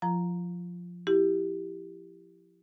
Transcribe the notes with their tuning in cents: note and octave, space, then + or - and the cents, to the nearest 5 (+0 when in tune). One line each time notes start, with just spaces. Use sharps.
F3 +15 F4 -25 A#5 +0
E4 +10 G4 +0